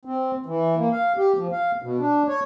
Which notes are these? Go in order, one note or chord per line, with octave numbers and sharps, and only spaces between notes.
C4
E3
A#3
F5
G4
F3
F5
B2
D4
C#5